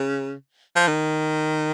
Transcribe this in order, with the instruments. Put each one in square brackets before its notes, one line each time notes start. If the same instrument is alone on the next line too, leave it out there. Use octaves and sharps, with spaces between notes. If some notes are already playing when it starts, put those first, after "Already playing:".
Already playing: [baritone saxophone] C#3
F3
D#3